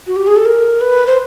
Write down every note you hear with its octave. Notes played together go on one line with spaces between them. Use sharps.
F#4
G4
G#4
A4
A#4
B4
C5